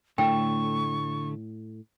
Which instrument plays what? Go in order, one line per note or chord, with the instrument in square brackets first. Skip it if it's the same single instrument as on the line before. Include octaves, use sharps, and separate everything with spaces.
[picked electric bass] A2 [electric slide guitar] D3 A3 [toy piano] G5 [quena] C#6